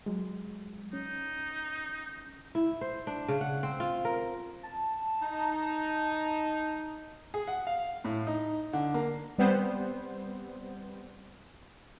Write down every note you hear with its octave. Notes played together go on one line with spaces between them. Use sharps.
F#3 G#3
C#4 D#4
E4
C5
D4
C#3
F#5
C4
F4
A#4
A5
D#4
G#4
F#5
F5
A2
D#4
D3
A#3
G3 B3 C4 C5